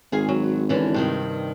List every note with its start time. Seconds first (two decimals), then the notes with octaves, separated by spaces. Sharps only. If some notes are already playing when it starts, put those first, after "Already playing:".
0.12 G#1 G#4 F5 G#5
0.29 F#3
0.69 D3 E3 C#4
0.94 G2 C3 D#3